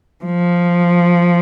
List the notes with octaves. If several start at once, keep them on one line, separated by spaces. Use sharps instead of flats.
F3